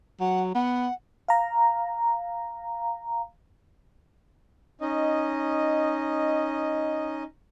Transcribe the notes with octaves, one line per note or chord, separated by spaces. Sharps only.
F#3 F#5
B3 F#5
F5 A#5
C#4 D#4 D#5